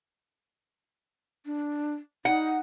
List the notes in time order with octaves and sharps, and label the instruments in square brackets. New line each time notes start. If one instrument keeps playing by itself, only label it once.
[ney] D4
[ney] D#4 [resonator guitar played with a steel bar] F#5